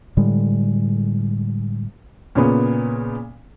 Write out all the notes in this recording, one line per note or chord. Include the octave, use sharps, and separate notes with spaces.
A2 D3 G3 G#3
A#2 C#3 B3